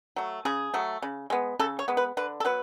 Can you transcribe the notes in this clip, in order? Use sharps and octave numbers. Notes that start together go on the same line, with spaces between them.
F#3 A3
C#3 G#4
F#3 A3
C#3
G#3 B3
C#3 A4
C#5
G#3 B3
B4
D3 B4
A4
F#3 B3 B4